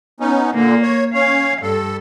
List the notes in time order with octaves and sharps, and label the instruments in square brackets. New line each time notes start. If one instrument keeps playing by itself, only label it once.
[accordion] B3 C#4 D#4
[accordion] A#2 D3 [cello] A#3
[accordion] C#5
[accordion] C#4 C#5 [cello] F5
[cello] G2 [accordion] A4